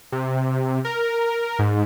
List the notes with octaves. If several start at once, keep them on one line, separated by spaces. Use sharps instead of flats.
C3
A#4
G#2